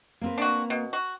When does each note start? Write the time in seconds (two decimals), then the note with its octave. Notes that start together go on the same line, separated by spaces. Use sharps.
0.21 A#3 C4 B4
0.38 D4 F#4
0.70 B2
0.93 F#4